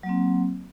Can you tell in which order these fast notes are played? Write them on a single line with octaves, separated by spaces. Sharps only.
F#3 A#3 C4